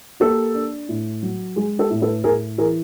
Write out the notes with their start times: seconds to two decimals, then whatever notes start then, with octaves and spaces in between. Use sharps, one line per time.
0.20 A#3 G4 A4
0.54 D4
0.89 A2
1.23 F#3
1.56 G#3 G#4
1.79 G4 A4
1.90 A2
2.01 A4 B4
2.24 A2 G#4 A#4
2.58 E3 G#4 A#4